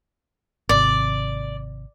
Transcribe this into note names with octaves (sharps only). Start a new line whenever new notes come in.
G#1 C3 D5